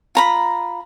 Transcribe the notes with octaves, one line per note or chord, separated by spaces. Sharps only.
F4 A#5 B5